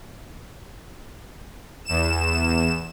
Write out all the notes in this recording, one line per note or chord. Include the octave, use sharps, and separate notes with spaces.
E2 E7